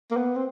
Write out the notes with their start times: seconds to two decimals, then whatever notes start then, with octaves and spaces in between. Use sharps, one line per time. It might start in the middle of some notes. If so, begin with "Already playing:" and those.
0.11 A#3
0.17 B3
0.36 C4